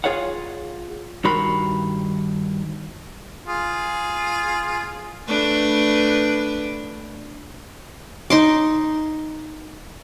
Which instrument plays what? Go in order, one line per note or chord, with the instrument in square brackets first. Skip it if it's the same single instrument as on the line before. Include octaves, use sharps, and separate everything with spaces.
[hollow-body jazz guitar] F4 G#4 C#5 F5 F#5
G2 D#3 F#4 A#4 B5 C6
[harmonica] F4 G#4
[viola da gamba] A3 D4 B4
[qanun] D#4 C6 D6